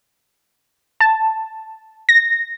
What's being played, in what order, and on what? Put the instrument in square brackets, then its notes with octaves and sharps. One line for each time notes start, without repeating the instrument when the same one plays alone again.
[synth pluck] A5
A#6